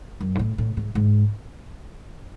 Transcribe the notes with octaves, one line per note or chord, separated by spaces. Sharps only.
F#2
G#2
A2
A2
G#2
G#2